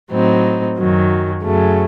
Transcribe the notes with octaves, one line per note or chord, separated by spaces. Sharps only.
A2 F#3 C4 D#4
F#2 D#3 F#3
F#2 C#3 F#3 A3